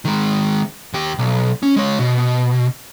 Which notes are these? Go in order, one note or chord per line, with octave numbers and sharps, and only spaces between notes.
D#3 G#3
D#2 G4
B1
C#4
G#3 C#5
B2